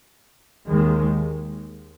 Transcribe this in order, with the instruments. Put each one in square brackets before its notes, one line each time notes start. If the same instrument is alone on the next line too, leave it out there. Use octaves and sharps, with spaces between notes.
[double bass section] D#2 D#3 G#3